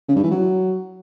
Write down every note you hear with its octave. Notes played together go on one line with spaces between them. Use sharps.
C#3
G2
E3
F#3